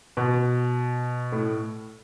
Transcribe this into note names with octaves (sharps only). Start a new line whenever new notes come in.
B2
A2